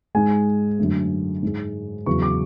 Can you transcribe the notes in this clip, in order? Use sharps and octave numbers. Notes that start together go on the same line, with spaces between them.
G#2 G#3 G#5
F#2 D3 A3
G#2 G#3
E2 C#3 F#3 C#6
D6